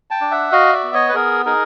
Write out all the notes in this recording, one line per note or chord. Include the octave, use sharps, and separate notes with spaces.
G5 A5
D4
E5 F#5
F#4 D#5 F5
D5 E5
B3
C#5 D#5
B4
B3 G#4 A#4
D#4 G#4 A#4